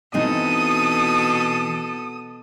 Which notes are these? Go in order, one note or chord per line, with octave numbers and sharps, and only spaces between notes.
B2 E3 C4 D#4 A4 D#6